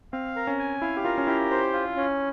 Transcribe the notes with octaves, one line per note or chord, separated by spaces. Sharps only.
C4 F5
A#4
C#4
G#5
E4 F5
G4
F4 A#4
C#4
E4 G4
C5
F4
C#4